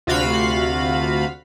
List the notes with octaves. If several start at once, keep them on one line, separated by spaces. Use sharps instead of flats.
D2 C3 F4 F#4 F5 B5